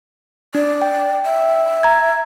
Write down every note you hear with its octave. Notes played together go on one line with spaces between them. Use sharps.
D4 D5
G5
E5
A#5 G#6